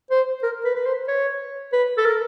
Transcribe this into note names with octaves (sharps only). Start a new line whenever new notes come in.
C5
A#4
B4
B4
C5
C#5
B4
A4
A#4